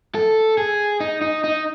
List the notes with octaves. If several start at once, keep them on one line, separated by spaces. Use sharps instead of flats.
A4
G#4
D#4
D#4
D#4